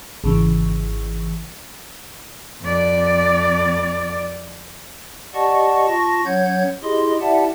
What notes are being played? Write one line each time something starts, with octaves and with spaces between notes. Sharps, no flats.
G#1 C#3 E3
F2 D5
G4 D5 D#5 F#5 A5 C#6
F4 A5 C#6 A#6
F#3 C#4 C#5 F#5 G6 G#6
E4 G4 G#4 D#5 C6
E4 G4 D5 E5 F#5 A5